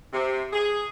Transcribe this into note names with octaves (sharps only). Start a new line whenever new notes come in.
C3
G#4